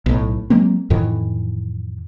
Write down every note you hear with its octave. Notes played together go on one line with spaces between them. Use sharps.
B1 A2
F#3 G#3 A#3 C4
F2 A2 D#3 E3